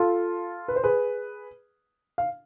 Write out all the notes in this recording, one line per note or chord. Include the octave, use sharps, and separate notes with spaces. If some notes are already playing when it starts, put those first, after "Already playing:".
Already playing: F4 A4
B4
C5
G#4 B4
F5